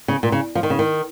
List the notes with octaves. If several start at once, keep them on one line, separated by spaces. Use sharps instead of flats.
C#3
A#2
C#3
F3
D#3
C#3
D#3